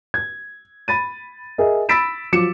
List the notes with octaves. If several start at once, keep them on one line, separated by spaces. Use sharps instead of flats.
G#6
B5 A6 D#7
G#4 A#4 D#5 E5
B5 E6 A6 B6 D7 E7
F3 F#3 D6 C#7 E7